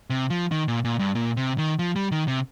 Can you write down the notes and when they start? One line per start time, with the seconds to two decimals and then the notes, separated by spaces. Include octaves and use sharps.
0.10 C3
0.30 F3
0.51 D#3
0.68 A#2
0.85 A#2
0.99 G2
1.15 A#2
1.37 C3
1.58 D#3
1.79 F3
1.96 G3
2.12 D#3
2.28 C3